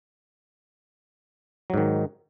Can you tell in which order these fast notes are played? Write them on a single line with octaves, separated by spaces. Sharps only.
F#3 G#2 D#3